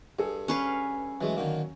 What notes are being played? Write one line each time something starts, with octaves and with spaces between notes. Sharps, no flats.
G2 G#4 A4
C#4 B4 F5
E3 F#3 G#3 A3
D3 D#3 A#3